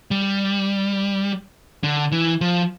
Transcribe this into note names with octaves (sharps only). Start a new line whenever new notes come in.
G3
D3
E3
F3